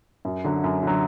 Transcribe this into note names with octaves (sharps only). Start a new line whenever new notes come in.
F#2
D3 F#3
F#2
D3 F#3